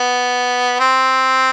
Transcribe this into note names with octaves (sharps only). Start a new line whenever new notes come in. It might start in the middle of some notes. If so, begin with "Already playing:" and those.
Already playing: B3
C4